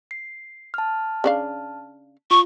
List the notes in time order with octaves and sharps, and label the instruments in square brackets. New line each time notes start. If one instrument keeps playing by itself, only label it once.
[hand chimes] C7
A5 F6
[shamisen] C#3 D4 F5
[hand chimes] F4 [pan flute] C#6